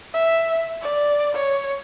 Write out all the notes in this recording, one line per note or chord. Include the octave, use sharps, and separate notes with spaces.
E5
D5
C#5